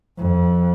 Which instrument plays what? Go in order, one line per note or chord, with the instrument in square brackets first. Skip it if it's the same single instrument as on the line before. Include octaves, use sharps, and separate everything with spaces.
[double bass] F2